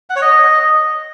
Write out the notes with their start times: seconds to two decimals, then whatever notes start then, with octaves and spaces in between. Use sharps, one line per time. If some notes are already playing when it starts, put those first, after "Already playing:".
0.10 F#5
0.16 C#5
0.22 D#5